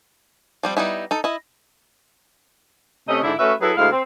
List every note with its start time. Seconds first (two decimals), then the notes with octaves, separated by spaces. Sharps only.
0.63 F3 G3 C4
0.77 G3 B3 D#4 E4
1.11 D#4 A4
1.24 E4 D#5
3.09 C3 A3 C#4 D#5
3.23 G#2 D3 D4 E4
3.39 A3 C#4 F#4 B4 E5
3.61 F#3 E4 G#4 A4 B4
3.77 D2 G#3 E4 F5
3.92 C4